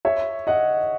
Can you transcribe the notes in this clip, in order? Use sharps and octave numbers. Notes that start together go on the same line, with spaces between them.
C#5 E5
D#5 F#5